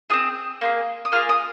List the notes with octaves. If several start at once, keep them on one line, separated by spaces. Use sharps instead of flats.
C4 F4 G#4 D#6
A#3 F4 G#4
D#6
A#3 F4 G#4 F6
D#6